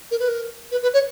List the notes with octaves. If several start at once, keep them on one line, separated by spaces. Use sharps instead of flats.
A#4
B4
A#4
B4
B4
C#5